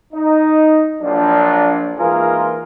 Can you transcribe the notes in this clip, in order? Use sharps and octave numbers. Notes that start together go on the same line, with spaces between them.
D#4
A#1 F3 F#3 D4
G#1 E3 A#3 F4 G#4 A#4